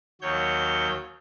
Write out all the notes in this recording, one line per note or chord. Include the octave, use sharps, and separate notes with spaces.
D#2 F#3 C#5 G6